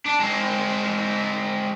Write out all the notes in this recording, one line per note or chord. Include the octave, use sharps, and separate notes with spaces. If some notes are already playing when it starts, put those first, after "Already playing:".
D4
G#3 C4